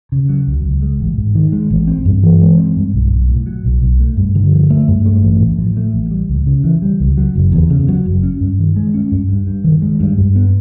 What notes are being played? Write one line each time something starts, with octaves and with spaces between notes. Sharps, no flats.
C#3
F#3
C#2
C#2
G#3
A1
G#2
D#3
G#3
A1
C4
G2
E3
G#3
C4
G2
B1
B1
A2
F#3
B1
B1
A3
G2
D3
F3
A3
G2
A3
A1
A2
F3
A3
A1
G3
C#2
C#3
E3
G3
C#2
F#3
F#1
E2
C#3
F#3
F#1
C#4
G2
D#3
G#3
C#4
G2
G2
G2
D#3
G#3
G2
G2
B3